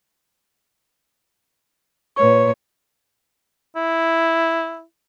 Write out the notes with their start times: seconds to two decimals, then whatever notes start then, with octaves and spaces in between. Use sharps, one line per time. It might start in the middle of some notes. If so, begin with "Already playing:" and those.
2.16 A#2 B4 C#5 C#6
3.76 E4